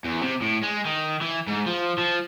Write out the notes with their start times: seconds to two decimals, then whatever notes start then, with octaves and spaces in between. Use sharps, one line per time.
0.05 E2
0.22 C3
0.42 A2
0.63 G#3
0.86 D#3
1.22 E3
1.48 G#2
1.67 F3
1.99 F3